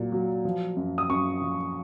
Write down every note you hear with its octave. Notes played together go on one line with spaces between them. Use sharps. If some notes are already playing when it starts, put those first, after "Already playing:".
Already playing: A#2 F#3
F#3
F3
F#2
D#6
F#2 C#6
F3